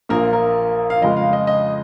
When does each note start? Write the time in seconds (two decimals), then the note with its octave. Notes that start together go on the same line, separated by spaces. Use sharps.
0.09 A#1 A#2 A#3 A#4
0.33 A#4
0.90 F5
1.02 F2 C#3 G#3 D#5
1.17 F5
1.33 D#5
1.47 D#5